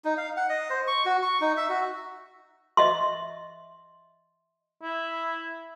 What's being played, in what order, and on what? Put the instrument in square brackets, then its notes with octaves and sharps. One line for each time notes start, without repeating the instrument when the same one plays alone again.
[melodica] D#4
F5
F#5
D#5
C5
C#6
F#4
C#6
D#4
E5
F#4
[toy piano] D#5 E5 C6
[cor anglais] E4